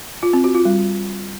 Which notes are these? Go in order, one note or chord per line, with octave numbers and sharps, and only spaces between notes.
F4
C4
F#4
F4
G3